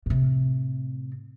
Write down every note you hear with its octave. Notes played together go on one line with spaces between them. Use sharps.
A2 C3